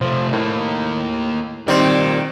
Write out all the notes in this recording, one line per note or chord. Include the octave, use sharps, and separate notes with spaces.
C3 F3 A3
A2 A#3 D#4
D#3 G3 C4 A#4 D5